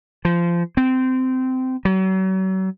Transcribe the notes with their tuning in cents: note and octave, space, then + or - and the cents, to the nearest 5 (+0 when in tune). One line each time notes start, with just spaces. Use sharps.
F3 -20
C4 -20
F#3 +40